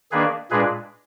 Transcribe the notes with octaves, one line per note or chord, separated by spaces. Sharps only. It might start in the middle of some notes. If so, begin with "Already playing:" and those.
D#3 A#3 D4 G#4 B4
A#2 G#3 D4 G#4 B4